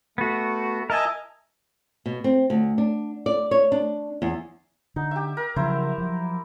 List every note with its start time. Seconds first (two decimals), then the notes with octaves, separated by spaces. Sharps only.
0.18 A3 B3 F#4
0.90 A#4 D#5 E5 G#5 A5
2.06 B2
2.24 C4
2.50 D2
2.78 D4
3.26 D5
3.51 C#5
3.72 D4
4.22 E2
4.96 D3 D#4
5.11 G4 E5
5.37 A#4
5.56 C#3 F3 F#3 E4 C5
5.98 F3 F#3